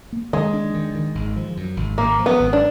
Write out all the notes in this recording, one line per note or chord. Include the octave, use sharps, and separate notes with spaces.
A#3
D#3 G#3
D4
D#3
D#3
G#1
F3
F#2
G#1
G#1 A#3
F3
B3
G#1
D4